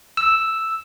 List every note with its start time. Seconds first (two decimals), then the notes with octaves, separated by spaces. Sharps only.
0.17 E6